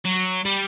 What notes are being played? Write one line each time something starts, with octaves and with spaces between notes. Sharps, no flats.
F#3
G3